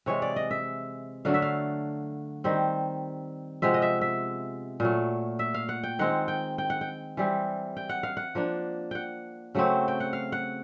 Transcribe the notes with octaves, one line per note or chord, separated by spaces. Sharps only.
C3 E3 G#3 C#5
D5
D#5
E5
D3 F#3 A3 D4 F5
E5
F5
D#3 G3 C4
C3 F3 G#3 B3 E5
D#5
E5
E5
A#2 F#3 A3
E5
F5
F#5
G5
D#3 G#3 C4 F#5
G5
G5
F#5
G5
E3 G3 C4
G5
F#5
F5
F#5
F3 A#3 D4
F#5 G5
C#3 F#3 A3 C4
G5
F#5
F5
F#5